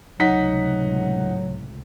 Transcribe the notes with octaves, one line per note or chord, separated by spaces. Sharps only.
C#2 A2 C3 F#3 D#4 F#5 B6